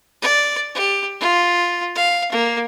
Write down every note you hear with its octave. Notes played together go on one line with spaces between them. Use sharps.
D5
G4
F4
F5
A#3